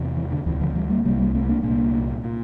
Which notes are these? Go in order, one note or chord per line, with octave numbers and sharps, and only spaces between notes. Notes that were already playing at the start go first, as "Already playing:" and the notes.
Already playing: E2 C3
E3
D3
D2 C3 E3
D3 F3
E3 G3
G3 A#3
C2 C3 G3 A#3
G3 A#3
A3 C4
A#3 D4
C2 A#2 A#3 D4
A#2